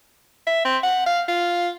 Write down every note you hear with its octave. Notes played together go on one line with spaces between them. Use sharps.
E5
C4
F#5
F5
F4